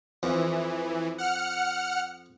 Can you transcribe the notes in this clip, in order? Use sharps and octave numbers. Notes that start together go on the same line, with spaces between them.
F2 E3
F#5 F6 C#7